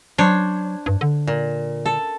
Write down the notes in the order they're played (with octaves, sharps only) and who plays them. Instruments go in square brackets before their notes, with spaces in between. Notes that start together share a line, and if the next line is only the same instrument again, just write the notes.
[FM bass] F#3 [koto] D4 C5 C#5
[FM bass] G2
D3
[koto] A#2
A4